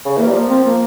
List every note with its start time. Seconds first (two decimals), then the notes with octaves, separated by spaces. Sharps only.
0.05 C#3
0.17 E3 A#3
0.26 G3
0.33 F3 A#3
0.48 C4
0.64 A#3